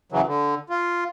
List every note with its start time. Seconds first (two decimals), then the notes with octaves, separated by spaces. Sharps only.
0.12 C#3 E3 F#3
0.27 D3
0.70 F4